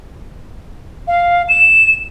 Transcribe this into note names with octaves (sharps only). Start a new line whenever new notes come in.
F5
E7